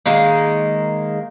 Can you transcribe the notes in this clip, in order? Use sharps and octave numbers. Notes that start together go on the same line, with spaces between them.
D#3 G#3 A#3